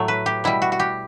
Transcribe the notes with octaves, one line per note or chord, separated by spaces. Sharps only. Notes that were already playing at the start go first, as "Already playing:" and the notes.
Already playing: A2 F#3 A3
B4
G4
B2 G3 E4
F#4
F#4
G4